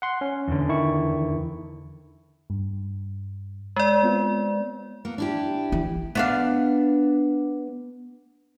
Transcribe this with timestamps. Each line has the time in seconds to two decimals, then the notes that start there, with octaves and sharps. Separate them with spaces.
0.02 F#5 C6
0.21 C#4
0.48 E2 D3
0.69 D#3 E4 C#6
2.50 G2
3.76 G#3 D5
4.03 B3 C4 F4
5.05 A#3 B3
5.18 D4 E4 G4
5.72 E3
6.15 B3 D4 F5